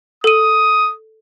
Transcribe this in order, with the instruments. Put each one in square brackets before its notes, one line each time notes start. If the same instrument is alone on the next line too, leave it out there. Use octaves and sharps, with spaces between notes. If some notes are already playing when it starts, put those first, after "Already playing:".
[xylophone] A4 D#7 [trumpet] D#6